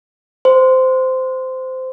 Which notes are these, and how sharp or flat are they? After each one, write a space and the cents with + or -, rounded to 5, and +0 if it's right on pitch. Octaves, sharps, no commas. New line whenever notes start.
C5 -15